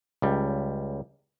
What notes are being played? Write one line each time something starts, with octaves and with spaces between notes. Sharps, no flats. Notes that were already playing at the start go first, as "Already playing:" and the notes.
C#2 G3